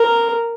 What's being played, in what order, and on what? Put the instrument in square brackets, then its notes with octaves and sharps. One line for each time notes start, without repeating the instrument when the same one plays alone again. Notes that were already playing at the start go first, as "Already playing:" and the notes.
Already playing: [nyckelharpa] A#4